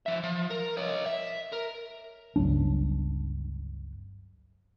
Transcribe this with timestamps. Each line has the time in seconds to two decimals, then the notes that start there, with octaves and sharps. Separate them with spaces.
0.06 F3 E5
0.23 F3
0.50 A#4
0.77 C#5 D#5
1.06 E5
1.52 A#4
2.36 G1 C#2 F#3 D4